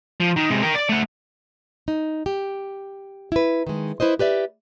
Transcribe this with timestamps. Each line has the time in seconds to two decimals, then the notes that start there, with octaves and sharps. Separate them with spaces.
0.20 F3
0.36 D#3
0.50 C3 G#3
0.62 A#4 G5
0.75 D5
0.89 A3 F#5
1.88 D#4
2.26 G4
3.32 E4 B4
3.67 D#3 G#3
4.00 E4 B4 C5 D#5
4.19 G4 B4 D5 E5